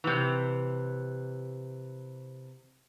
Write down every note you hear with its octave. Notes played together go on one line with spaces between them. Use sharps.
C3 E3